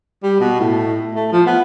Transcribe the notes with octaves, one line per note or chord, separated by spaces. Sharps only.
G3
B2
A2
A3
F3
B3